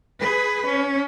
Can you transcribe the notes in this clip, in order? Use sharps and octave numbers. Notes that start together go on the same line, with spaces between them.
G#4 B4
C#4